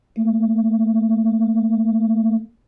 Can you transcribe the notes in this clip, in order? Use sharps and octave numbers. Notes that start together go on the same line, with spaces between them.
A3 A#3